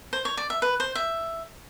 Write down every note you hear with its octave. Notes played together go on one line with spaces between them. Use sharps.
C5
C#5
D5
E5
B4
C5
E5